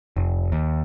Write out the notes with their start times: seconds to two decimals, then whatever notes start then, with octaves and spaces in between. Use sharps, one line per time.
0.17 F1
0.52 D#2